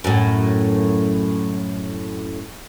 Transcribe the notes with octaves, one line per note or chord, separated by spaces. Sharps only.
F#2 A2